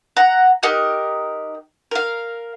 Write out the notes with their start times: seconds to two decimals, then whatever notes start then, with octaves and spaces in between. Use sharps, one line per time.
0.17 F#5 A#5
0.63 D#4 G4 A#4 F#6
1.91 A#4 F5